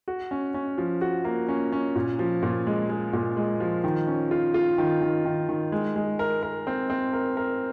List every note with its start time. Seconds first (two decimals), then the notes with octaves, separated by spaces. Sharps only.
0.08 F#4
0.31 C#4
0.54 C#4
0.78 F3
1.01 F#4
1.25 A#3
1.49 C#4
1.72 C#4
1.96 A#2
2.19 F3
2.43 A#2
2.67 G#3
2.89 G#3
3.13 A#2
3.37 G#3
3.60 F3
3.84 D#3
4.07 C#4
4.31 F4
4.54 F4
4.78 D#3
5.02 D#3
5.25 D#3
5.49 D#3
5.72 G#3
5.96 G#3
6.19 A#4
6.43 A#4
6.67 C4
6.90 C4
7.13 A#4
7.37 A#4